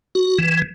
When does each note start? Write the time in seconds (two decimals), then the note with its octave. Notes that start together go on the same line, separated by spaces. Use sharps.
0.15 F#4
0.39 E3